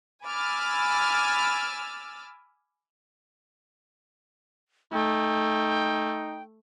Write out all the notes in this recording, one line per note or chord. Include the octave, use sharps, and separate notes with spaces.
G#5 B5 D6 E6 F6 A6
A3 D#4 G5